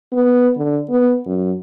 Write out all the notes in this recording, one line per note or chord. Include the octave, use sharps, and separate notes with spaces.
B3
D3
B3
F#2